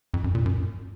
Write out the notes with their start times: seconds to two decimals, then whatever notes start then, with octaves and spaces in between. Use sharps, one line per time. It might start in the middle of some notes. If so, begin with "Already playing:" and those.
0.14 F2
0.24 F#2
0.35 A#2
0.46 F#2